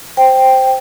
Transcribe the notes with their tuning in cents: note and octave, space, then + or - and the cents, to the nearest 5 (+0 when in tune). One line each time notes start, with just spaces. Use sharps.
C5 +0 G5 +0